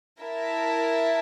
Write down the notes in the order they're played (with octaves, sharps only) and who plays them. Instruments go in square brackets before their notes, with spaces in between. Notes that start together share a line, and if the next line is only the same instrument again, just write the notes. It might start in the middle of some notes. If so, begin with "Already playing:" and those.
[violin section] E4 A#4 E5 A5